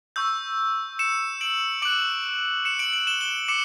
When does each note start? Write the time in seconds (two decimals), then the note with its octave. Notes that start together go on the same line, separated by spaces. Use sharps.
0.16 C#6 E6 G6
0.99 C#7 E7
1.41 D7 F#7
1.82 D6 F#6 D7 F#7
2.65 C#7 E7
2.79 D7 F#7
2.93 D7 F#7
3.07 E7 G7
3.21 E7 G7
3.48 D6 C#7 E7